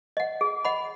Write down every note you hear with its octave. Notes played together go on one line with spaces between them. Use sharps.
D#5 F#5
G#4
D#5 F#5 B5